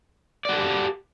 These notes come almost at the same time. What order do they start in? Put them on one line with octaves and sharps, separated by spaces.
D5 F#4 A4 G4